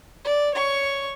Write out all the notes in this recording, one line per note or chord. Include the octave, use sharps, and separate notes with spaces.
D5
C#5 C#6